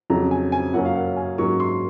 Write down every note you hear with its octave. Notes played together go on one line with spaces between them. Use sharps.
F2 C#3 F#3 A#5
G#5
G#5
F#2 C#3 F#3 A#3 C#4 F#5
F5
F#5
G#5
G#2 F#3 A#3 C#4 C#6
C6